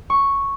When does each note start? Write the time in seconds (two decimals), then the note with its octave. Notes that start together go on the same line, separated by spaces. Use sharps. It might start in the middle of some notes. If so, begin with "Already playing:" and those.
0.10 C#6